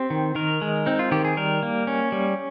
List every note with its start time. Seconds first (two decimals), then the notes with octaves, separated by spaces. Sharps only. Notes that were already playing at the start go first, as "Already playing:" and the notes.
Already playing: C4 G4
0.10 D#3
0.35 D#3 A#4
0.62 G#3
0.86 C4 D#4
0.99 F4
1.12 D#3 G4
1.25 G#4
1.37 G3 A#4
1.63 A#3
1.87 C#4
2.12 G3